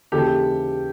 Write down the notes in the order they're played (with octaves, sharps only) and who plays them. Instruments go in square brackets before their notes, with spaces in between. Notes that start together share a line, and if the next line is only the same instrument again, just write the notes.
[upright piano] D#2 C#3 E3 G4 A4